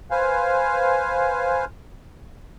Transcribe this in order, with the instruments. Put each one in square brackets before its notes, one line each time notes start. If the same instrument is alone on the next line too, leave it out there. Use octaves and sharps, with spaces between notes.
[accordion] B4 C5 F5 G#5